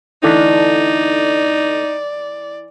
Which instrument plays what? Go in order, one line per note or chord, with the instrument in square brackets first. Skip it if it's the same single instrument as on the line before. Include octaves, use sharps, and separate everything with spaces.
[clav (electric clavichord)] D3 A3 D4 [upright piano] E3 [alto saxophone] D#4 [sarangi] D5